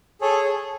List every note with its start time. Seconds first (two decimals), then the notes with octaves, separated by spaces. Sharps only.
0.21 G#4 A4 C#5